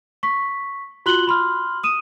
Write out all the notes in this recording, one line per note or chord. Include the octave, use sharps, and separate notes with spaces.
C#6 B6
F4 F#4 C6 F#6 F#7 G7
B5 C6 F6
D#6 D#7 E7